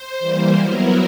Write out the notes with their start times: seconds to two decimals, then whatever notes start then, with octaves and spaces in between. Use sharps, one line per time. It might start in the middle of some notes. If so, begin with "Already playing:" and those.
Already playing: C5
0.19 E3 G3 A#3
0.56 F#3 B3 E4 A#4